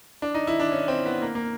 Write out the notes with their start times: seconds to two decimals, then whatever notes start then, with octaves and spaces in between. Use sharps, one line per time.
0.22 D4
0.34 D#4
0.47 E4
0.60 D4
0.72 C#4
0.88 C4
1.06 B3
1.22 A#3
1.35 A#3